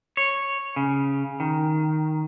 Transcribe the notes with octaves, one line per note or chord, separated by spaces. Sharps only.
C#5
C#3
D#3